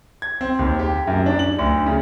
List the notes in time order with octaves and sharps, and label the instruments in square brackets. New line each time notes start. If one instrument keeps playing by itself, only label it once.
[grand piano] G#6
C4
D#2
G4
F#2
D4
F#7
D2
C#3